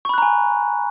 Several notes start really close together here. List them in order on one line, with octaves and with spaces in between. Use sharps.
C#6 B5 F#6 A#5 G#5